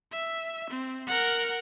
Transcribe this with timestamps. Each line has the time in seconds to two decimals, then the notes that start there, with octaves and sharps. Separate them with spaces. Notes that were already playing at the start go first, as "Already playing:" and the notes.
0.11 E5
0.69 C4
1.07 A#4 F#5